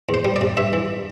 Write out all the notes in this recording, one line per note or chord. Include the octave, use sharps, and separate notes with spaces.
E2
C5
G3
D5
C3
G2 E5
E3